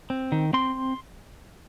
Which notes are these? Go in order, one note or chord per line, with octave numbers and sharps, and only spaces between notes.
C4
D#3
C4 C6